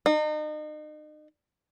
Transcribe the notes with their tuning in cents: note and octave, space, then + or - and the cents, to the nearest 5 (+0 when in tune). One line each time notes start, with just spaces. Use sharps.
D#4 -35